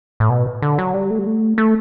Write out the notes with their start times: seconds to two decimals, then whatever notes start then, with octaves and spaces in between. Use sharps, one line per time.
0.20 A2
0.30 B2
0.62 D3
0.78 F#3
0.94 G3
1.10 A3
1.19 G3
1.27 A3
1.58 A3